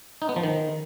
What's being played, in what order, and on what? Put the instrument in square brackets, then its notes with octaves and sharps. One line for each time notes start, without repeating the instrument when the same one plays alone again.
[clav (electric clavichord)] D#4
B3
F3
D#3